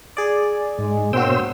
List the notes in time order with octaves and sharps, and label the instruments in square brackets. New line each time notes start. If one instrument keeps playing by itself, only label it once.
[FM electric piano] G#4 D5
[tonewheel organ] G#2 [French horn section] G#3
[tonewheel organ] B2 C5 E6 [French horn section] A#3 D4 C#5 [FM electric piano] F#4 G5